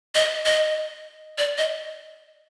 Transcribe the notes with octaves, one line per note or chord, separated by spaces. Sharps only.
D#5
D#5
D5
D#5